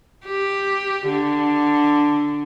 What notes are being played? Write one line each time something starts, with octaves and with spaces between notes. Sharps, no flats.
G4
D3